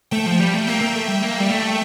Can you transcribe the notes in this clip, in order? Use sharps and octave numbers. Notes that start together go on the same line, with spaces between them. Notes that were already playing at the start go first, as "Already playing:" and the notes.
A3 G5
F3
G3
A3
A#3 E5
A#3
A3
G3
A#3
G3
A3